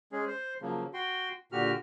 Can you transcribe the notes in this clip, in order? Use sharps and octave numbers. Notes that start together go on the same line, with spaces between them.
G#3 C#4 G#4
C5
C#3 F3 F#3 A#3
F#4 G5 C6
A#2 D3 F#4 G4 F6